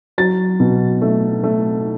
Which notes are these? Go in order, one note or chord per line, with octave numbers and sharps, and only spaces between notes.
F#3 A6
B2
A3
A3